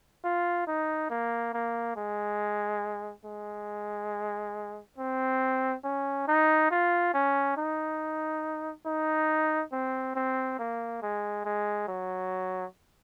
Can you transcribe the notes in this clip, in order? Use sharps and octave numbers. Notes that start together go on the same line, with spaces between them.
F4
D#4
A#3
A#3
G#3
G#3
C4
C#4
D#4
F4
C#4
D#4
D#4
C4
C4
A#3
G#3
G#3
F#3